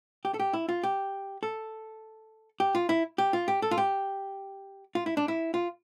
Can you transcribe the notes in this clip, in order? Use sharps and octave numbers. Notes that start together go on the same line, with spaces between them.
G4
A4
G4
E4
F4
G4
A4
G4
F4
E4
G4
F4
G4
A4
F4
G4
F4
E4
D4
E4
F4